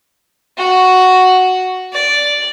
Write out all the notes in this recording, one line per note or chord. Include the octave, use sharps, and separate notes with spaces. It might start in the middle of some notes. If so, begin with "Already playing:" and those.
F#4
D5